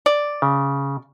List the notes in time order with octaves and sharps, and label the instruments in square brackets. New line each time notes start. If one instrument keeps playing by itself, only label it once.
[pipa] D5
[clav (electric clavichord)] C#3